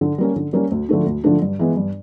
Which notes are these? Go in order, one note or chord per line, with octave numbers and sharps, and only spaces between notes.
D3
G3 A#3 C#4
D3
G3 A#3 C#4
D2
D3 F3 A3 D4
D2
D3 F3 A3 D4
G2
E3 G#3 B3
G2